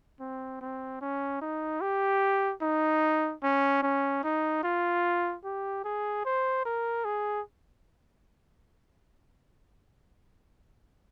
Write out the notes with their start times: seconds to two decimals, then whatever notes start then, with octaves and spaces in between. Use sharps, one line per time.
0.20 C4
0.61 C4
1.01 C#4
1.41 D#4
1.81 G4
2.62 D#4
3.43 C#4
3.83 C#4
4.24 D#4
4.63 F4
5.44 G4
5.84 G#4
6.25 C5
6.65 A#4
7.04 G#4